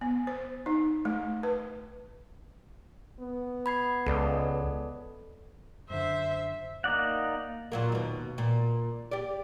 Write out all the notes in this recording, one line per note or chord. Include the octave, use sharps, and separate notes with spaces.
B3
C5
D#4
A3
B4
B3
B5 G#6 C7
C#2 A4 D5
F#2 D3 C5 E5
A#3 D#4 D5 F#5
A#2 F#3 A#3
D#2 B2
A#2
G4 D5